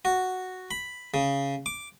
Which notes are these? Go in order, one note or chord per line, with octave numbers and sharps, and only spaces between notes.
F#4
B5
C#3
D6